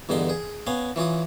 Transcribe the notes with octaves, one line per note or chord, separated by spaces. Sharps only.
E2 G2 D3 D#4 C6
G#4
B3 C#4 F5 G#5
E3 C#4 F4 D#6